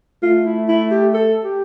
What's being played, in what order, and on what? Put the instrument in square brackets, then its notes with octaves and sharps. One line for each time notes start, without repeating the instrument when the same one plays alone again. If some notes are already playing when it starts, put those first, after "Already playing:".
[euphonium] A3 [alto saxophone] F4
[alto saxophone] E4
E4
G4
A4
G4